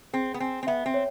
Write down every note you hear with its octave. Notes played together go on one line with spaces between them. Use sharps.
C4 G#4
B3
C4 G#5
C4
B3 E5
C4
C#5